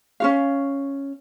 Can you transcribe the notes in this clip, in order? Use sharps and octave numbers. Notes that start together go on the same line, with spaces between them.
C#4 F#4 F5